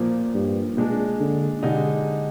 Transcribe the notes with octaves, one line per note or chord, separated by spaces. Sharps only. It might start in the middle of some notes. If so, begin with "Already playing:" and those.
Already playing: A#2 F3 A#3
G2
A#2 G#3 D4
D3
D3 G#3 D#4 G4